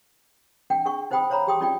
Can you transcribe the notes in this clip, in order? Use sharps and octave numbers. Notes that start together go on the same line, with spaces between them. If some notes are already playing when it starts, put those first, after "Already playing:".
D4 F#5 G5
D4 G#4 F#5 C#6
D#4 C5 F#5 G5 B5 D#6
C5 C#5 F5 A#5 B5
G4 G#4 G5 C6 D#6
C#4 D#4 F4 D5 F5 G5